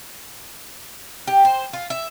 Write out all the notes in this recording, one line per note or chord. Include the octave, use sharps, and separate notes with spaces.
G4
C5
F4
E5